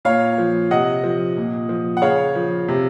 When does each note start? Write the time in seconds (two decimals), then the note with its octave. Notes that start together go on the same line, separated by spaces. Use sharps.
0.05 A#2 C#5 F5
0.38 F3
0.71 C3 D#5 F#5
1.04 F3
1.37 A#2
1.69 F3
1.97 F#5
2.02 C#3 C#5 F5
2.35 F3
2.68 C3